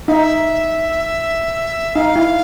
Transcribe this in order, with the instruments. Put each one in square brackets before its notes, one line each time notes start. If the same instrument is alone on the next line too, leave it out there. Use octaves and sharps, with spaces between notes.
[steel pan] D#4 [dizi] E5 F5
[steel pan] D#4 [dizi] F5
[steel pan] E4